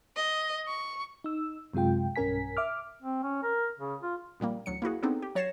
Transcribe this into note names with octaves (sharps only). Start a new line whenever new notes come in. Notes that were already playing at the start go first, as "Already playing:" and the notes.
D#5
C#6
D#4 E6
F#2 C3 G#3 F4 G5
B1 G2 C#4 A#4 G#5 B6
E5 D6 F6
C4
C#4
A#4
C#3
F4
A#1 A#2 G3 A#3
A1 D2 F#3 C#7
A#3 E4 F#4 G#4
B3 C4 D4 D#4 G#4 A4
G4
F#3 C#5 A6 A#6 C7 E7